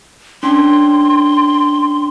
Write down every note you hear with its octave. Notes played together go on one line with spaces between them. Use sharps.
C#4 D4 G5 C6